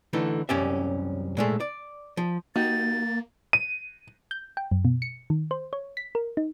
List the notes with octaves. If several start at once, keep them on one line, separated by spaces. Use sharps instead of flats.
D3 E3 A3 D#4
C2 F#2 C#4 G4 D5 E5
A#2 G#3 A3
D5
F3
A#3 D#4 F#4 G4 A6
D#7
G6
G5
F#2
B2
C#7
D#3
C5
C#5
B6
A#4
D#4